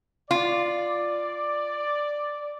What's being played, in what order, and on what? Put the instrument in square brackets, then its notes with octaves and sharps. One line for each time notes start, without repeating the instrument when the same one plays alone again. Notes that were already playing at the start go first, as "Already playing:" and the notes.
[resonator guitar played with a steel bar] F4 [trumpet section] D5